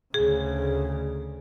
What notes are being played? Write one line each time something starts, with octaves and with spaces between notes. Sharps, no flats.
D2 C#3 G#4